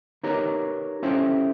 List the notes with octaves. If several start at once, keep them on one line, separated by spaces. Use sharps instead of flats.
D#4 G4 A#4 B4 C#5
C#4 E4 F4 G4 A4 C5